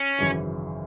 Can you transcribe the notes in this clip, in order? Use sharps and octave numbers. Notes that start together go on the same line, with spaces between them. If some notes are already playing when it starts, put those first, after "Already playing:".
Already playing: C#4
G#1 F#2 C#3 E3